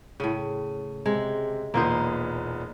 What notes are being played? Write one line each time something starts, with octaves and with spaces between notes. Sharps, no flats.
A2 C#3 D#7
C3 G#3
E1 A#2 A#3 B3 D#4 C5